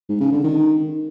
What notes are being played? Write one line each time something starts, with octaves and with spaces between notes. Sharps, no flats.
G#2
C#3
D3
D#3